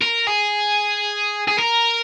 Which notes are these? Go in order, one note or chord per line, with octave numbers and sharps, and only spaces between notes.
A#4
G#4
G#4
A#4